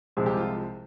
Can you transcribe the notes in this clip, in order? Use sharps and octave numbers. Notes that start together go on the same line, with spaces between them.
C2 C3 F3 G#3 G#4
G4
F4